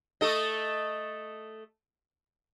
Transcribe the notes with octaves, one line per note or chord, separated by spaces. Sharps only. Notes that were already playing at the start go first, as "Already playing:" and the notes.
A3 A4 D#5